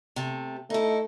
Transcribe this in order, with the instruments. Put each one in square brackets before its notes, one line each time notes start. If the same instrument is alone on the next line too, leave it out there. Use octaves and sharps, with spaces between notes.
[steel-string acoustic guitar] C3 A3
[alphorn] A3 [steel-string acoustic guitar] D#4 E4